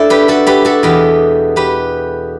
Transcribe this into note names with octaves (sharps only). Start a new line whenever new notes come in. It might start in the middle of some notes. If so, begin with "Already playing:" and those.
Already playing: D4 E4 A4
G4 B4
F#4 A4
G4 B4
F#4 A4
E2 B2 G4 B4
G4 B4